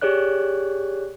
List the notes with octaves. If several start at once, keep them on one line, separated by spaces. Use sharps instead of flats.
G4 G#4 C#5 D5 F#6